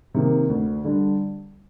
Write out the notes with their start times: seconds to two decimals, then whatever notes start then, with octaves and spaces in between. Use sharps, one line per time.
0.14 C3 D#3 A#3
0.50 D2
0.84 D3 G3 D4